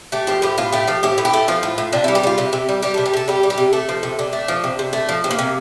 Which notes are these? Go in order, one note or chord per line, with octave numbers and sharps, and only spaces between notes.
A3 G4
F3 G4
A2 G4
A2 F4
A3 G4
F3 G4
A2 G4
A2
G4
A3
F3 F4
A2
A2
C3 D4
G3 E4
G4
G3 F4
C3 G4
C3
G3
G3 G4
C3 A4
G4
C3 A4
G3 G4
G3
G4
C3
A3 A4
F3
C3
C3 D4
A3
F3
C3
C3
A3
F3
C3
A#3
C3